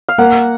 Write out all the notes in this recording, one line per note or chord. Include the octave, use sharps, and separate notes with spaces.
F5
A#3 F#5